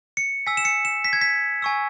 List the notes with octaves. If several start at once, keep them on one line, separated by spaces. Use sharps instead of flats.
C#7
G#5 E6 B6
E7
C#7
E7
B6
G#6
B6
G#5 C#6 E6